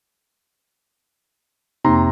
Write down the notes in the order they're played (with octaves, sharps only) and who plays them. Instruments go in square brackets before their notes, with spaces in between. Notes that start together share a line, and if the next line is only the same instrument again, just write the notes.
[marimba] F2 A#3 D#4 [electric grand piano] C3 A#5 C6